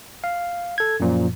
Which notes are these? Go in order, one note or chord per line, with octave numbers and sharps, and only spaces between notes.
F5
A4 G#6
F#2 A#2 F3